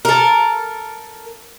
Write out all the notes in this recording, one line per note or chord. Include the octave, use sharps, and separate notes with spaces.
A4 A#4